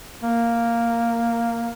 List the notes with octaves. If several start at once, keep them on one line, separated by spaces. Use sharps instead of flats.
A#3